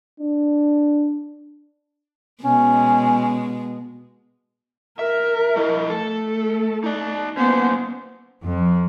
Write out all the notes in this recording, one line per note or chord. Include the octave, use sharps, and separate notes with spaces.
D4
B2 G#3 C#4
A#4 E5
F3 E4 D#5
A3 A4
D#4 D5
A#3 B3 C#4 C5
F2